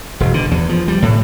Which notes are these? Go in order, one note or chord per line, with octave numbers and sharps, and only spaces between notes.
E1
D3
E2
F3
G3
A2